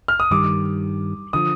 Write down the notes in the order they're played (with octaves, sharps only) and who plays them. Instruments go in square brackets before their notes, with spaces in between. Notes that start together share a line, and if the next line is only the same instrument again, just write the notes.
[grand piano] F6
D#6
[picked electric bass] G2 D#3 G3 [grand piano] D6
[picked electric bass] D3 F3 [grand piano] D#6